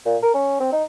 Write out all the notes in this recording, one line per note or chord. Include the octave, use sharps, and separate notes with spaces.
A#2
A#4
C#4
C4
D#4